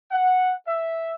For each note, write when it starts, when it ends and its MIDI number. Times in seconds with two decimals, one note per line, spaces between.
0.11 0.53 78
0.67 1.15 76